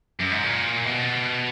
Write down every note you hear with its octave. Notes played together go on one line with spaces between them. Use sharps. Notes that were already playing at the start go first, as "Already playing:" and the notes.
F#2
G#2
A#2
B2